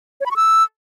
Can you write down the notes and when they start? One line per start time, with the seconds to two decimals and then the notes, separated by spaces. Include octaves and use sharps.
0.21 C#5
0.26 B5
0.31 C#6
0.36 E6